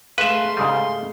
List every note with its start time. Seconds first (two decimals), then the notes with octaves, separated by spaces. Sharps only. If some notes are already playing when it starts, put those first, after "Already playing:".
0.18 G#3 A3 B4 E5 F5 C6
0.57 G#2 C#3 G3